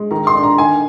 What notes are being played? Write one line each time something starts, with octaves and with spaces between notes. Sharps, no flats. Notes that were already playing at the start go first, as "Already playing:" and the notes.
Already playing: G#3
D#3 A#5
C6
D4
A#5
D#3 G#5